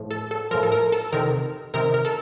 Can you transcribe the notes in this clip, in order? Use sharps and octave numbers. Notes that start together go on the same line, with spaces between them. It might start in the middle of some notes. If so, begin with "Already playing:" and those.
Already playing: A2 F3
A4
A4
A2 F3 A#4
A4
A#4
A4
C3 D#3 A#4
C3 D#3 A#4
A#4
A4